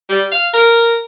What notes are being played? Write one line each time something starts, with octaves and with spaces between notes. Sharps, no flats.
G3
F5
A#4